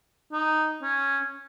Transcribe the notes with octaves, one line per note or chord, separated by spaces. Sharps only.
D#4
C#4